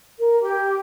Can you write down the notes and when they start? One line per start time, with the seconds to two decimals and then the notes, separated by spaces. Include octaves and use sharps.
0.18 A#4
0.41 G4